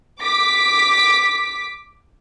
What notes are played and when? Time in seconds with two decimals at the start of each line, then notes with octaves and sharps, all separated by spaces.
0.21 D6 B6